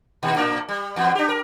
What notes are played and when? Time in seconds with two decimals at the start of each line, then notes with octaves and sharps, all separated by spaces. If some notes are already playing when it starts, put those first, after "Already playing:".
0.23 A#2 D#3
0.36 A2 D4 A#4
0.69 G3
0.96 E2 B3
1.15 D4 G4
1.29 A#4